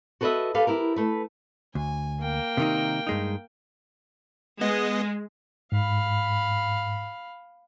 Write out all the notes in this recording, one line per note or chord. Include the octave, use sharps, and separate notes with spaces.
F#4 A4 B4 C5 D#5 E5
G4 A4 B4 F5
E4 G4 A#4
A3 B4
D2 G#5
A#3 G5
C3 D#3 D#4
G2 G#3 D#4
G#3 B3 D#5
G#2 F5 B5